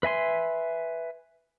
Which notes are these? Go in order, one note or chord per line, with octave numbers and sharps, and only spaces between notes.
B4 E5 G#5 C6